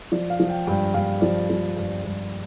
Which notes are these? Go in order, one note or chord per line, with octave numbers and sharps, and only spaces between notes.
F3 D5
F5
F3
G5
G2 G5
G2 F5
F3 D5
F3
G2
G2